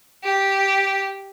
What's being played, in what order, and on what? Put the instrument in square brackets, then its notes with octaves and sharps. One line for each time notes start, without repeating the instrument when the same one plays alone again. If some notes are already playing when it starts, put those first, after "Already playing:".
[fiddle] G4